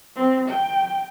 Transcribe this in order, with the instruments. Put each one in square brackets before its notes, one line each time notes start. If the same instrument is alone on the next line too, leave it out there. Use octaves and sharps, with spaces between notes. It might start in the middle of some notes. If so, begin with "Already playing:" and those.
[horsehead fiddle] C4
G5